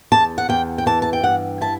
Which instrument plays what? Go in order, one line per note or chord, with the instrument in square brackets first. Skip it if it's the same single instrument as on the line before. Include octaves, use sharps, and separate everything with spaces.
[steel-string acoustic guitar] E2 A5
F#5
E2 G5
G5
E3 A5
A5
G5
G2 F#5
E4 A5